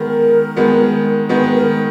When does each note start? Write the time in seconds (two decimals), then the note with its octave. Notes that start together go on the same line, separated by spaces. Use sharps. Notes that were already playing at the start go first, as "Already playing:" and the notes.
Already playing: D#3 G#3 B3 A#4
0.57 D#3 G#3 B3
1.29 D#3 G#3 B3 B4
1.54 A#4